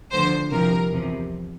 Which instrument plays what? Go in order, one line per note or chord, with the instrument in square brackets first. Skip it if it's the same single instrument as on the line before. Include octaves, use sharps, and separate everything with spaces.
[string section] D2 D3 F3 C5
C2 C3 F3 A#4
E2 C3 F3